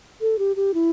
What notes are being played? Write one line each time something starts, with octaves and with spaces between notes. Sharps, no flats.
A4
G4
G4
E4